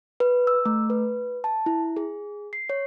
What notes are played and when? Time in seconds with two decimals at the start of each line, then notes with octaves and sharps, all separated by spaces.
0.20 B4
0.47 E6
0.65 A3
0.90 B4
1.44 A5
1.66 E4
1.97 G#4
2.53 C7
2.70 C#5